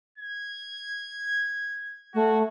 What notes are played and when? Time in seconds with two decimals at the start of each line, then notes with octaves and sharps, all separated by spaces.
0.18 G#6
2.14 A3 F#4